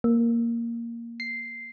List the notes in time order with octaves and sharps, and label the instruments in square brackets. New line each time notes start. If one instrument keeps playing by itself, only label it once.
[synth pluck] A#3
C7